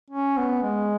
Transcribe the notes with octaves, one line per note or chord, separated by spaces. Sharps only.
C#4
B3
G#3